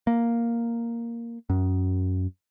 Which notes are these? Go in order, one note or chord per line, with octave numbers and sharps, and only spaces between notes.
A#3
F#2